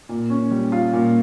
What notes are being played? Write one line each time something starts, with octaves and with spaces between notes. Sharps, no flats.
A#2
C#4
G3
F4
A#2